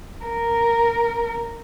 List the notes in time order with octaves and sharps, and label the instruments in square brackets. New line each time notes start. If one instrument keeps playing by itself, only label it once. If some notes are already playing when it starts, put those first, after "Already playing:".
[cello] A#4